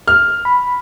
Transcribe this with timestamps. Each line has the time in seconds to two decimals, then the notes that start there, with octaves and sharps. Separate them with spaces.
0.08 F6
0.45 B5